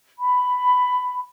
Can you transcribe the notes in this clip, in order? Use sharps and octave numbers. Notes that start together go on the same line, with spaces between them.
B5